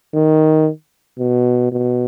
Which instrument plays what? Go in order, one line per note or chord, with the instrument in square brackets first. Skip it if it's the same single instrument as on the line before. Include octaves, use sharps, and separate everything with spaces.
[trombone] D#3
B2
B2